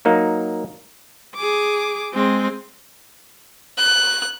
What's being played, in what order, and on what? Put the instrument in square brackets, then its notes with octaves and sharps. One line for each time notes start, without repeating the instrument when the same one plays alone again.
[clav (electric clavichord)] F#3 A#3 D#4
[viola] G#4 D6
G#3 C4
[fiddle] F#6